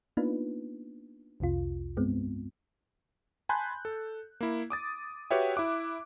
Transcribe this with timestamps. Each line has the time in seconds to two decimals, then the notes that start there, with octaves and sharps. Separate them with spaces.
0.17 A#3 B3 D4 D#4 F4 B4
1.40 C2 F2 C3 F4
1.97 G2 G#3 B3 C4
3.49 G#5 A5 B5 C6 F#6 G6
3.85 A4
4.41 A#3 E4
4.70 D6 D#6 A6
5.31 F#4 G4 B4 C#5 E5 G5
5.56 E4 E5 D6 F#6